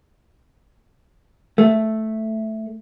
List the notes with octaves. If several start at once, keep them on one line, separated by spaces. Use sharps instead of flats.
A3